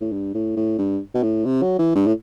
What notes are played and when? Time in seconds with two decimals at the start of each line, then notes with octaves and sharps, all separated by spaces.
0.01 A2
0.12 G2
0.34 A2
0.57 A2
0.79 G2
1.14 B2
1.23 A2
1.45 C3
1.62 F#3
1.79 E3
1.96 G2
2.07 A2